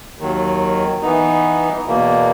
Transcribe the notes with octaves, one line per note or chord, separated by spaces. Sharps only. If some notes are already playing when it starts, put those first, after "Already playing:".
D#2 D#3 F#3
E3 B3 D#4
E2 B2 A#3